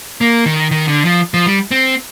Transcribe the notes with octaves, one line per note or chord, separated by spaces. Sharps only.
A#3
D#3
D#3
D3
F3
F3
G3
C4